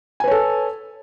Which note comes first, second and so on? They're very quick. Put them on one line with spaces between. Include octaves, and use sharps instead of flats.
G#5 B4 C#5 A4